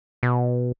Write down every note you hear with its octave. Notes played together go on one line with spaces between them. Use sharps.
B2